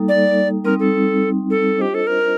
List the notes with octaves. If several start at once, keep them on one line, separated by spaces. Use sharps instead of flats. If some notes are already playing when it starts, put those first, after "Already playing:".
Already playing: G3 A#3 D#4 A4
D5
G3 C4 D#4 A#4
A4
A4
D4 F4 G4 C5 D#5
A4
A#4